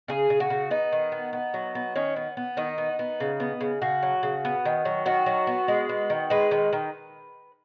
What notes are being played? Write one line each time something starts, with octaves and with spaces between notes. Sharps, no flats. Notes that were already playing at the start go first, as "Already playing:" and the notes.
C#3 G#4
C#3
F#4
C#3
B3 D#4
D#3
B3
B3
F#3
B3
D#3 C#4
B3
B3
D#3 D#4
B3
B3
C#3
B3
C#3
C#3 F#4
F#3
C#3
B3
D#3
F#3
D#3 F#4
F#3
B3
G#3
B3
D#3
G#3 B4
D#3
D#3